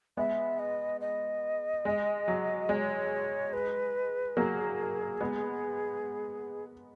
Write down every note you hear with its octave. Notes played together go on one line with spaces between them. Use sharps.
G#3 B3 E5
D#5
D#5
G#3
F#3
G#3 C#5
B4
F#3 A#3 G#4
G#3 B3